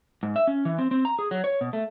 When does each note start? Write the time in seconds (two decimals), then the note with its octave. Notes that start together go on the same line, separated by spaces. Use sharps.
0.23 G#2
0.36 E5
0.47 C#4
0.65 E3
0.78 C4
0.91 C4
1.05 A#5
1.19 G#4
1.31 F#3
1.44 C#5
1.61 B2
1.73 A3